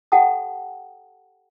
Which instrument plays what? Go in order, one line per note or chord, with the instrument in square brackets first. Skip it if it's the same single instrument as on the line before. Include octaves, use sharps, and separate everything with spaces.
[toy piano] G4 A4 F#5 G5 A5 D#6